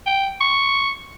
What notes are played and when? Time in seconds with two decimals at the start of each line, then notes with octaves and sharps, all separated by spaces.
0.06 G5
0.41 C#6